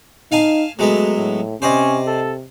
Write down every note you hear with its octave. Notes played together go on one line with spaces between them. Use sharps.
D#4 F5 G#5 A5
F#3 G#3 A3 B3
A2
C3 C#4 C5 D5 D#5
A4